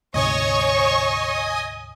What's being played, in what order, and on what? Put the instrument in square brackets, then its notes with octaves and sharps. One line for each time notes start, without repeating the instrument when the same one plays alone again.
[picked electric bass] D2 G#2 C3 [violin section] C#5 C#6 [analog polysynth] D#5 G#5 D#6